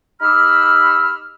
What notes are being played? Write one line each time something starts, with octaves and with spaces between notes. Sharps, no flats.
D#4 G4 B5 E6 F6